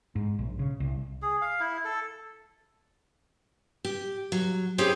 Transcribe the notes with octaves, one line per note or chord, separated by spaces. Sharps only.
G#2
A#1
C#3
C2
G#4
F5
E4
A4
G4
F#3
C4 E4 G4 G#4 C#5